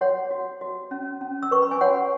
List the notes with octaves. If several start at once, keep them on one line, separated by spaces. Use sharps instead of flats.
F#4 C#5 F#5
F#4
F#4
C#4
C#4
E6
B4 C#6
B5
G#5
F#4 C#5 F#5